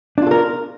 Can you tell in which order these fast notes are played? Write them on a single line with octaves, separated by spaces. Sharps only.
D4 F4 A4 A#4